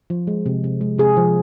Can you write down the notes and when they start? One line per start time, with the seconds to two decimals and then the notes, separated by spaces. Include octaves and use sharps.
0.10 F3
0.27 G#3
0.46 C3
0.64 C3
0.81 G#3
0.98 C3 G#4
1.17 F3